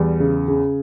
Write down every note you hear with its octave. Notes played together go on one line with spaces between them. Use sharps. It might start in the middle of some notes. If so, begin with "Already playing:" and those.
Already playing: E2 G3
C#3
C#3